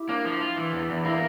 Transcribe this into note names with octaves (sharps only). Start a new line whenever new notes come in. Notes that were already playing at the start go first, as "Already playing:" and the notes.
Already playing: E4 G4
A#3 D4
F3
F4
E3
E2
E2
A#3 E4